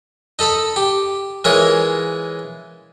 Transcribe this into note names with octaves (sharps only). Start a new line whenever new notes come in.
D#4 A4 B5 D#6
G4
E3 G#3 F4 A#4 C#5